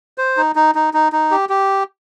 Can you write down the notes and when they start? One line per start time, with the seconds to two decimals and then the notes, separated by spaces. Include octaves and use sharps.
0.18 C5
0.37 D#4
0.56 D#4
0.75 D#4
0.94 D#4
1.12 D#4
1.31 G4
1.49 G4